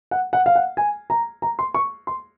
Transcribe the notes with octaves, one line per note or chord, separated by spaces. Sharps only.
F#5
F#5
F5
F#5
G#5
A#5
A#5
C6
C#6
C6